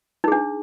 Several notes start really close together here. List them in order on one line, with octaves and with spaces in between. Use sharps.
D#4 G#4 D4